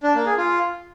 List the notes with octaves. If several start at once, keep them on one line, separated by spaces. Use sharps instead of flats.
D4
A#3
G#4
F4